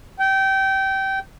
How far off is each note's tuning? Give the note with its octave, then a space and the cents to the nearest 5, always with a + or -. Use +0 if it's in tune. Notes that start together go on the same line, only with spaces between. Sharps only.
G5 -20